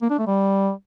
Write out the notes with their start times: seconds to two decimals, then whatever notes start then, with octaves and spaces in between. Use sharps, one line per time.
0.02 A#3
0.10 D4
0.19 A3
0.27 G3